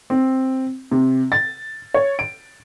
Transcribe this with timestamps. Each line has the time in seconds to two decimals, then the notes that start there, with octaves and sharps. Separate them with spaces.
0.10 C4
0.91 C3
1.32 A6
1.94 C#5
2.19 D7